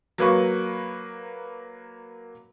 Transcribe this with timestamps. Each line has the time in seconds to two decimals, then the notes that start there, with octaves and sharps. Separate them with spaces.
0.18 F#3 A#3 B4 C#6